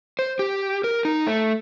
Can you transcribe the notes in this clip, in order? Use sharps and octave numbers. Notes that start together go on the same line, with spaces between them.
C5
G4
A#4
D#4
A3